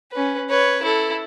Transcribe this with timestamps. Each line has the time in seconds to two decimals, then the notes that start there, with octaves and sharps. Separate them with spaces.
0.12 C#4 B4
0.50 B4 C#5
0.82 E4 A4